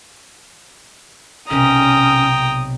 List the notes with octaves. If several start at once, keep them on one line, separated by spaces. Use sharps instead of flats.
B1 C3 C#4 G5 A#5 D#6